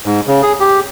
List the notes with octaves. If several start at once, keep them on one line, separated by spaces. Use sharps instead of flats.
G#2
C#3
G#4
G4